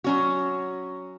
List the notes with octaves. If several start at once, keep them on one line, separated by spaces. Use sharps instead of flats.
F#3 C#4 F#4